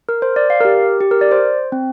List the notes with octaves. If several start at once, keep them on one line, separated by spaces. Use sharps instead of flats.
A#4
C5
D5
F5
A#4
G4
G4
A#4
D5
C5
C4